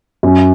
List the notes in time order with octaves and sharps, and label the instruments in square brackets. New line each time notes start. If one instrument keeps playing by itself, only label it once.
[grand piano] F#2